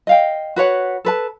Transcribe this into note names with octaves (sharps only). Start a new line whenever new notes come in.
D#5 F5 G5
F#4 B4 C#5 F#5
A4 B4 A5